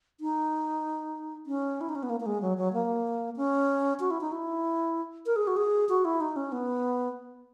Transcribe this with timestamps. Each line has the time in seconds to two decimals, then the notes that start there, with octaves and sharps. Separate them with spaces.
0.20 D#4
1.46 C#4
1.81 E4
1.89 D#4
1.95 C#4
2.03 B3
2.10 A#3
2.20 A#3
2.26 G#3
2.42 F#3
2.57 F#3
2.73 A#3
3.37 C#4
4.00 F#4
4.11 E4
4.21 D#4
4.32 E4
5.26 A#4
5.36 G#4
5.47 F#4
5.57 G#4
5.89 F#4
6.05 E4
6.20 D#4
6.36 C#4
6.52 B3